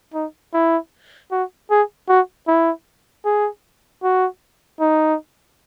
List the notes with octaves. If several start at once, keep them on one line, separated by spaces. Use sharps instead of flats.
D#4
E4
F#4
G#4
F#4
E4
G#4
F#4
D#4